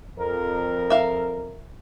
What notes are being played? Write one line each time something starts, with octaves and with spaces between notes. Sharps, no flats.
F2 A#4
E5 F5